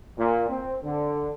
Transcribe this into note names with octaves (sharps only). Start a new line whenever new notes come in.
A#2
C4
D3